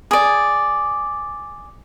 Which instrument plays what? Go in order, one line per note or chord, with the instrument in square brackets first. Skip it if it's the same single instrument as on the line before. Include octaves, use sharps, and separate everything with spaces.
[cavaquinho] G#4 D5